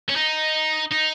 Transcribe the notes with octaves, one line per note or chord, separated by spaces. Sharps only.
C#4
D#4
D#4